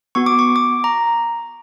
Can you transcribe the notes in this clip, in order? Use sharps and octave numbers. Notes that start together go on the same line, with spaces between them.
B3 F#4 C#6
D6
C#6
D6
A#5